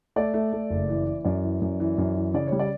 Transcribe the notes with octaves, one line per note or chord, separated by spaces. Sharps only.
A3 D5
A3
A3
F#1
E3
E3
F#2 D5
E3
F#2
E3
F#2
E3
C#3 D5
G3 C#5
D5